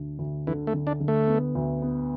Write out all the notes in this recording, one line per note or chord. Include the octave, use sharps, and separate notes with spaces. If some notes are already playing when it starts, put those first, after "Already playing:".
Already playing: D2 D4
D2
D3 E3
A3
D3
D4
D3
A3
B3
D2
B3